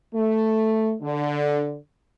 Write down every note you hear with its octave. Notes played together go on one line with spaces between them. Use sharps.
A3
D3